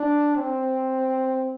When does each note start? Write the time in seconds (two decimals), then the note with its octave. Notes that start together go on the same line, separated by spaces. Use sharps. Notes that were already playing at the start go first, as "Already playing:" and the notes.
Already playing: D4
0.36 C4